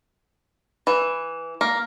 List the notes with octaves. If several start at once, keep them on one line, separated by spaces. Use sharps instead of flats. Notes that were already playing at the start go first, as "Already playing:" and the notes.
E3
A#3